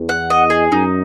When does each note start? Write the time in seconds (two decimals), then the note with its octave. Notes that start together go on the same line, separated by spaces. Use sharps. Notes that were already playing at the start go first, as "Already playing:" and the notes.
Already playing: E2
0.09 F#5
0.30 D#5
0.50 G#4
0.72 F#2 D#4